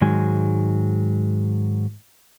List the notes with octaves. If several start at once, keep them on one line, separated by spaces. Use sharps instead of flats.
G#2 D#3 F#3 G#3 G#5